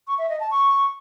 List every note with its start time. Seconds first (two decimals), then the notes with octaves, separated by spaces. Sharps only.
0.07 C#6
0.18 E5
0.29 D#5
0.40 A5
0.51 C#6